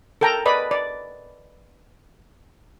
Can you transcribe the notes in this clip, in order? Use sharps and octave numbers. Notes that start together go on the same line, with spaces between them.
A4 A#4 G5 A5 A#5
B4 D5 D#5 B5
D5